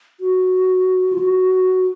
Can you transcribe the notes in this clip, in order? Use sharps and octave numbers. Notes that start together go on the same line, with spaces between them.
F#4
F4
F#4